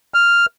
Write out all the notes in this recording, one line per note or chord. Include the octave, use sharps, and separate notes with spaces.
F6